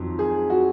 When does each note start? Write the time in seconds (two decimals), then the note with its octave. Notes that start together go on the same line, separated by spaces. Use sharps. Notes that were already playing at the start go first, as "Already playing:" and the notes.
Already playing: F2 D#3 F#3
0.19 G#4
0.50 F#4